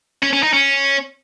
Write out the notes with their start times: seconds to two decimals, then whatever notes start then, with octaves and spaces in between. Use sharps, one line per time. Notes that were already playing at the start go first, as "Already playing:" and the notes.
0.23 C#4
0.33 C#4
0.43 D#4
0.53 C#4